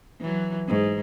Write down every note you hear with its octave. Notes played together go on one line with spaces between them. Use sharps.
E3 F#3
G#2